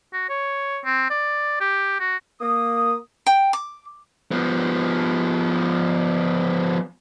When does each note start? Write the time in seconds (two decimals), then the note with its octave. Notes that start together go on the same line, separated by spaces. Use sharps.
0.13 F#4
0.29 C#5
0.85 C4
1.10 D5
1.60 G4
2.00 F#4
2.40 A#3 D#6
3.26 G5
3.53 D6
4.31 F3 B3